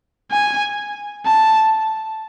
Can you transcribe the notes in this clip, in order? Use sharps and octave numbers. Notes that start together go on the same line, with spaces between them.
G#5
A5